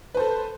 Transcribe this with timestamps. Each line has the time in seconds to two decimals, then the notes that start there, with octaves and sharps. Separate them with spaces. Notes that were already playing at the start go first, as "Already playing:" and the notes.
0.14 B4
0.17 C5
0.20 A4